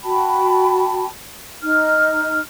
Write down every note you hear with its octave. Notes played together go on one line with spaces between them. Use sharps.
F#4 G5 A5 B5
D#4 F6